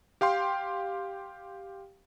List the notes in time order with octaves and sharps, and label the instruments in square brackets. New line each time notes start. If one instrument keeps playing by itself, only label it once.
[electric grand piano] G4 F5 G5 C6